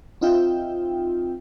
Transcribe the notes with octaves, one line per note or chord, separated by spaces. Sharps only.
C4 D#4 F4 E5 G5